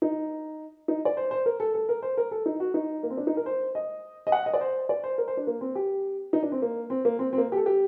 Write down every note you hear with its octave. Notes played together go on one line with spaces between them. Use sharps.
D#4
D#4
D5
C5
C5
A#4
A4
A4
A#4
C5
A#4
A4
D#4
F#4
D#4
A#3
C4
D4
D#4
A#4
C5
D#5
D#5
F#5
D#5
D5
C5
D5
C5
A#4
C5
D4
A#3
C4
G4
D#4
D4
C4
A#3
C4
A#3
C4
C4
A#3
G4
A4
G4